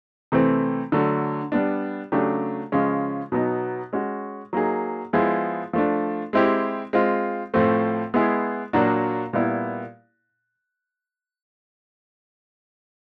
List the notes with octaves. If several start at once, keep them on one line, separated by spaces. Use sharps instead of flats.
C3 E3 A3 C4
D3 F#3 A3
G3 B3 D4
C#3 F#3 A3 D4 G4
C#3 F3 G#3 C#4
B2 F#3 B3 D#4
G#3 C#4 F#4
F#3 A#3 D#4 G#4
F3 G#3 B3 E4 G#4
F3 A3 D4
G#3 C4 E4 G4
G#3 C4 F4
A2 F3 A3 C4
G#3 B3 E4 G#4
A#2 F#3 A#3 D4 F#4
A#2 G3 B3 E4